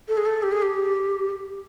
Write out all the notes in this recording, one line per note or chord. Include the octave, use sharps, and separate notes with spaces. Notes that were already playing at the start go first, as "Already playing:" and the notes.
A4
G#4
A4
G4
G#4
G4